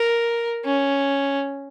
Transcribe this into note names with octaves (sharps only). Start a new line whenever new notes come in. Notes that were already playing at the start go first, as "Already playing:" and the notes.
Already playing: A#4
C#4